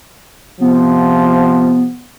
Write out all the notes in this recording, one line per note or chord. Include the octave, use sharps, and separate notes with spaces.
C3 F3 B3